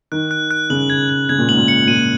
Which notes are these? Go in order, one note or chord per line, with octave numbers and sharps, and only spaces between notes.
D#3 F#6
F#6
F#6
C#3 F#7
G#6
G#6
C#3 G#6
A#2
G#2 F#7
A#2
C#7
A#2 D#7